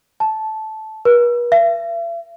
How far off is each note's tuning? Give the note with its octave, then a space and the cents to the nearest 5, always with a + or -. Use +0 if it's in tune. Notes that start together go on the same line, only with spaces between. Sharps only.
A5 -10
B4 -45
E5 +45